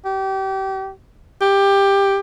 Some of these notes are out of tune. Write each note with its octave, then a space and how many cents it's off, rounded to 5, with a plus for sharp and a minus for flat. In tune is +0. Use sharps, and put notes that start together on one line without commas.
G4 -30
G4 +15